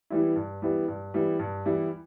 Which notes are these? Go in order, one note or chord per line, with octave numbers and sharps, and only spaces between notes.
E3 G3 B3 E4
G2
E3 G3 B3 E4
G2
E3 G3 B3 E4
G2
E3 G3 B3 E4